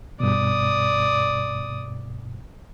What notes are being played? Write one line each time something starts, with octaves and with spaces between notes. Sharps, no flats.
G2 B2 D5 D#6